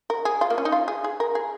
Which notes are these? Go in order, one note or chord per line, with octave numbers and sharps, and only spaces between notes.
A#4
G#4
F4
A#3
C#4
D#4
F4
G#4
G#4
A#4
G#4